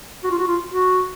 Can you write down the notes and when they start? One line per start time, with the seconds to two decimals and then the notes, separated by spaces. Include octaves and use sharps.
0.24 F#4
0.31 F4
0.38 F#4
0.48 F4
0.71 F#4